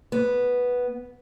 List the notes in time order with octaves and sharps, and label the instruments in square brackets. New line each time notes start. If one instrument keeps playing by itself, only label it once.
[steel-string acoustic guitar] B3